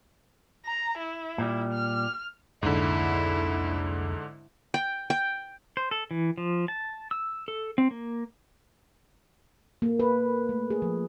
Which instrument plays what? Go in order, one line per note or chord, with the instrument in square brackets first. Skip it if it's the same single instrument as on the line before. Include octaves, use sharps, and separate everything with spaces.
[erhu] A#5
E4
[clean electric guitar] A#2 G3
[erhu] F6
[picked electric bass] C2 F2 A#3 [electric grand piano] G#2 D3 [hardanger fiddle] E4
[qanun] G5
G5
[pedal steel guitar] C5
A4
E3
F3
A5
E6
A4
C4
A#3
[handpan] A#3
B4
A3
G#4
F3